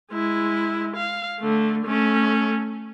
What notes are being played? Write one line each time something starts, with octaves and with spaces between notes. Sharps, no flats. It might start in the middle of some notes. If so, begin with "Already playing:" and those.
G#3 E4
F5
D3 A3
A3 C#4